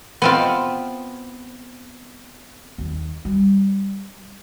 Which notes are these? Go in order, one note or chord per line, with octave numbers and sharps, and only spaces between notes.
B3 C4 F4
D#2
G3